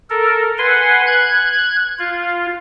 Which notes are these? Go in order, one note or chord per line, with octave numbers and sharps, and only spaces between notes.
A4 A#4
B4 F#5 G#5 C6
F#6 G#6
F4